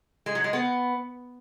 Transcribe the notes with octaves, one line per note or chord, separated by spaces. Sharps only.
G#3
F#3
G#3
B3